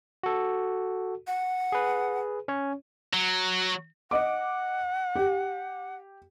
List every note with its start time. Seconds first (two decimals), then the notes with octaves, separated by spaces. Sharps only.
0.23 F#4 A4
1.27 F#5
1.72 G#4 B4
2.48 C#4 C#5
3.14 F#3
4.11 D#5 F#5 D6
5.16 G4